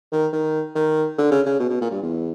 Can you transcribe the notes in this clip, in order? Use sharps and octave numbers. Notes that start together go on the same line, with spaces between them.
D#3
D#3
D#3
D3
C#3
C#3
B2
B2
A#2
G2
E2